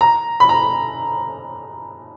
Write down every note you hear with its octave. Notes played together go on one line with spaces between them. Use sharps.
A#5
B5
A#5